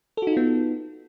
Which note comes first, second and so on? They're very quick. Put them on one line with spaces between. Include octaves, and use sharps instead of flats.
A4 F#4 D#4 F4 B3